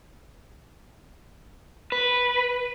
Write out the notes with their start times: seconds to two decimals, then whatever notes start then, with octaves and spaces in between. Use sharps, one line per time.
1.92 B4